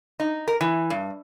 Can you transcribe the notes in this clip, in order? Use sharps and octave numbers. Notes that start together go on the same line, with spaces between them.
D#4
A#4
E3
G2